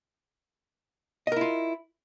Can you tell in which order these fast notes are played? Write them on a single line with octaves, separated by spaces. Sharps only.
D#5 A#4 E4 F4